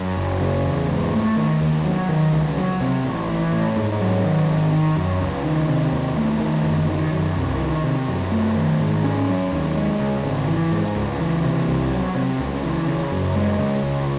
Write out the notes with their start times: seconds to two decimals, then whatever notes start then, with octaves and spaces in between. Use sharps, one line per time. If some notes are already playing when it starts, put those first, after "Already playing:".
Already playing: F#2
0.17 F#1
0.41 C#3
0.65 E2
0.89 G#2
1.13 A3
1.36 D#3
1.61 D#2
1.85 F#3
2.09 D#3
2.33 C#2
2.57 F#3
2.81 C3
3.05 A1
3.29 E3
3.52 A2
3.76 G#2
4.01 F#3
4.24 D#3
4.49 G#1
4.72 D#3
4.97 F#2
5.21 C#2
5.44 D#3
5.68 C3
5.92 D#2
6.16 A3
6.40 D#3
6.64 F#1
6.88 D#3
7.12 F#2
7.36 C2
7.60 D#3
7.84 C3
8.08 F#2
8.32 A3
8.56 D#3
8.80 G#2
9.04 C#4
9.28 F#3
9.52 D#2
9.76 G#3
10.00 C#3
10.24 G#1
10.48 E3
10.72 G#2
10.96 C#2
11.19 E3
11.43 C3
11.68 C2
11.91 F#3
12.15 C3
12.39 C#2
12.63 E3
12.87 C#3
13.12 F#2
13.36 G#3
13.59 C#3
13.83 C#2